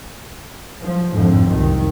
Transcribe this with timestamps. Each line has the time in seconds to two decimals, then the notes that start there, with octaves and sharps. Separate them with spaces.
0.81 F3
1.11 G#1 F2 A2 D3 F3 C4
1.46 F#1 C2 F2 D#3